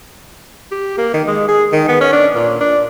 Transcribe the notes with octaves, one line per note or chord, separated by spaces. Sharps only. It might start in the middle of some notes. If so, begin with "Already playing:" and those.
G4
A#3
D#3
G#3
G#4
D#3
B3
C#4
D4
A#2
D4